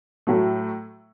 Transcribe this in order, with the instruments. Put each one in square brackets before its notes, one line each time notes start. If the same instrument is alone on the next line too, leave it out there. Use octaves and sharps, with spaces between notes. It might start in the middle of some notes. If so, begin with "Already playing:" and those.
[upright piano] A2 F#3 A3